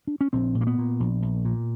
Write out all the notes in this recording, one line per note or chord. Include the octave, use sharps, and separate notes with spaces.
D4
C#4
A#1 C4
A#2
A#3
B3
A#2
A#1
A#1
A#2